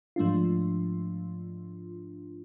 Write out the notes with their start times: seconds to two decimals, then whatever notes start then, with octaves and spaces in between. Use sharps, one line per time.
0.16 G#2 F3 A3 D4 F4